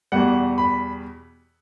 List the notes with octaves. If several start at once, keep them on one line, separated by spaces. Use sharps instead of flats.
E2 B2 G3 F#5
B5